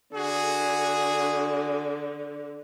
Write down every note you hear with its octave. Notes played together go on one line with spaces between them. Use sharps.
D3 F#4 G#4